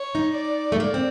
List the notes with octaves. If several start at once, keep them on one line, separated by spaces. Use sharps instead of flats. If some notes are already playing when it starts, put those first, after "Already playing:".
Already playing: C#5
D#4
D5
A3
A#3
C4